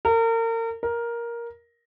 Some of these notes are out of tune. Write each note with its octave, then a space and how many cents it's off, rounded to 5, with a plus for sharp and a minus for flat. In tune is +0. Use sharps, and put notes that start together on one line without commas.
A#4 -35
A#4 +10